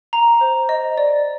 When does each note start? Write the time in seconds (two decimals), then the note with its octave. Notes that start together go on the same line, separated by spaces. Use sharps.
0.13 A#5
0.41 C5
0.69 D#5
0.98 D5